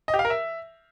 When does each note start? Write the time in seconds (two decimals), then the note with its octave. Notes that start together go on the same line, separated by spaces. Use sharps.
0.08 D#5
0.14 G4
0.19 F5
0.25 A#4
0.30 E5